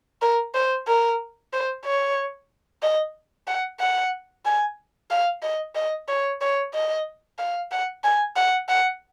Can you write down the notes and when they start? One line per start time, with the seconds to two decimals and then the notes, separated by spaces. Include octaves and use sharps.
0.22 A#4
0.55 C5
0.87 A#4
1.53 C5
1.85 C#5
2.83 D#5
3.47 F#5
3.80 F#5
4.45 G#5
5.10 F5
5.43 D#5
5.75 D#5
6.08 C#5
6.41 C#5
6.74 D#5
7.38 F5
7.71 F#5
8.04 G#5
8.36 F#5
8.69 F#5